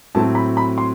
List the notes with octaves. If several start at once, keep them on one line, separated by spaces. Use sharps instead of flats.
A2 F#3 C4 A5
B5
B5
C6